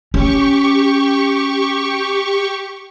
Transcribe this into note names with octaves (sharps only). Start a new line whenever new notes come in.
C#4 G4 C#6